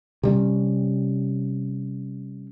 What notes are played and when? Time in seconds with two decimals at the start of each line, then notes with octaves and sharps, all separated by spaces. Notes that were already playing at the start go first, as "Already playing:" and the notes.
0.23 C3 G3 C#4